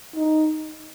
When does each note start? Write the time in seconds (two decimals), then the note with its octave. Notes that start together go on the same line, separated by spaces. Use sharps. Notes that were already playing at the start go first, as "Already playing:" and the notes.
0.16 D#4